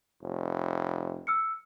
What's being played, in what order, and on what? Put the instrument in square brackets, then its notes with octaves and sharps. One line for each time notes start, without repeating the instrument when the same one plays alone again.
[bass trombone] F1
[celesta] E6 F6 C#7